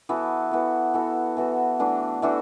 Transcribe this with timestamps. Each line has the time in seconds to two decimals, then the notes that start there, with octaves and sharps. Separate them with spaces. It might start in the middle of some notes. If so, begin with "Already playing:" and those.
0.09 E3 B3 F#4 A4
0.51 E3 B3 F#4 A4
0.94 E3 B3 F#4 A4
1.37 E3 B3 F#4 A4
1.79 E3 A3 D4 F#4
2.22 E3 A3 D4 F#4